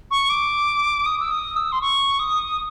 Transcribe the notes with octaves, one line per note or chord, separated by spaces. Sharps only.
C#6
D6
D#6
E6
D#6
E6
C6
C#6
D#6